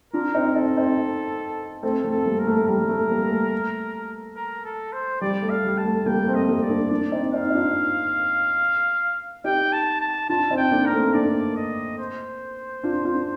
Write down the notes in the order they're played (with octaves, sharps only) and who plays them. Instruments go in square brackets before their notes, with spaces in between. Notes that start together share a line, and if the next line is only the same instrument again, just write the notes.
[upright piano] D4 F4 [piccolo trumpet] A#4
[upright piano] C4 D#4
[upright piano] C4 D#4 [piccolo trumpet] A4
[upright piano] C4 D#4
[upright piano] A3 C4 [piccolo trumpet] A4
[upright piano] A3 C4
[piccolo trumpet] A4
[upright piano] G3 A#3
[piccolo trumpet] A#4
[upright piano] A3
[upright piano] G3 [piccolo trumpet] A#4
[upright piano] G3
A3
G3 A#3
A3
[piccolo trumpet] A#4
A4
C5
[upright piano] G3 [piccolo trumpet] D5
[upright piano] A3
[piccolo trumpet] F5
[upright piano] G3
[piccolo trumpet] A5
[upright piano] A3
[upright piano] G3 A#3 [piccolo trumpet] G5
[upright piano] A3 C4
[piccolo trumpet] D#5
[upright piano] G3 A#3
[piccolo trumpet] D5
[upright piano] A#3 D4
[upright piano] A#3 D4 [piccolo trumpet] D5
[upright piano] C4 D#4
[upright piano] C4 D#4 [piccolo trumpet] F5
[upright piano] D#4
D4 F4
[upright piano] D#4 G4 [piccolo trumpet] G5
[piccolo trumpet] A5
A5
[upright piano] D4 F4 [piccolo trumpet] A5
[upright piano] C4 D#4
[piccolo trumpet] G5
[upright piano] A#3 D4
[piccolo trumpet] A#4
[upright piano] A3 C4
[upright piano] A#3 D4 [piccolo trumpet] D5
[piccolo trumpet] D#5
C5
[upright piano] D4 F4
D4 F4